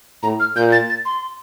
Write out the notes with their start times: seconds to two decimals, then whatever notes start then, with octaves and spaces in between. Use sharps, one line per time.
0.23 A2 A#5
0.40 F6
0.56 A#2 G6
0.72 A6
0.90 A6
1.05 C6